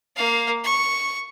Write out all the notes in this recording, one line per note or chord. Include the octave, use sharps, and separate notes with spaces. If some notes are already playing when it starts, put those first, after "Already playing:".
A#3 F5
C#6